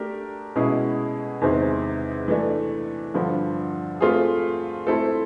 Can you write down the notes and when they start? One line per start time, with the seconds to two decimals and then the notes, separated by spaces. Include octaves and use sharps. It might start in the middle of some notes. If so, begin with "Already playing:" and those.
Already playing: A3 D4 G4 A#4
0.56 B2 G#3 C#4 E4 G#4
1.41 E2 C3 D#3 G#3 C4
2.28 E3 A3 D4
3.14 G2 D3 F3
4.01 A3 C4 F4 G#4
4.87 A3 C4 E4 A4